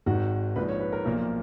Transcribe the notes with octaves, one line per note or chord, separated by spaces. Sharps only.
G#1 G#2 D#3 F#4
A#1 G#2 F3 B4
C#5
B4
A#4
B1 A#2 F3 A#3